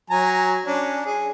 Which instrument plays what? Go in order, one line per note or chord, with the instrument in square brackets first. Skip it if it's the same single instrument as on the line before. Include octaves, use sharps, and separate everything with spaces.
[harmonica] F#3 G#5 A#5
C#4 D4
G#4